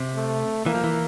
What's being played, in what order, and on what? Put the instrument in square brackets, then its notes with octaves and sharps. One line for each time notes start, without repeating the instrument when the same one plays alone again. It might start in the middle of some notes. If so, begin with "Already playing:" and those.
Already playing: [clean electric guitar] C3
[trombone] A3
[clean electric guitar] E3 [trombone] A#3
[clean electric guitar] F3
E3